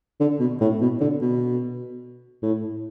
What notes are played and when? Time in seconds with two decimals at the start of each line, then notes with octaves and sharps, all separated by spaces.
0.20 D3
0.40 B2
0.61 A2
0.81 B2
1.01 D3
1.22 B2
2.43 A2